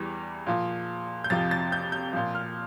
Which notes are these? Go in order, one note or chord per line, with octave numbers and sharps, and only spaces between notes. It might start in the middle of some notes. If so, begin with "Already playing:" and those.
Already playing: E2 E3 G3
A#2 F3
G6
F2 C3 F3 A6
A6
G6
G6
A#2 F3
F6